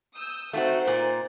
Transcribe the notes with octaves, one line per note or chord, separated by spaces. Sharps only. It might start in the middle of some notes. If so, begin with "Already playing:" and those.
D#6 E6 G6
A3 C4 D#4 F4 F#4 C5
A#2